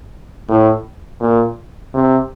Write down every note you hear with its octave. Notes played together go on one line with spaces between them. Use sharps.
A2
A#2
C3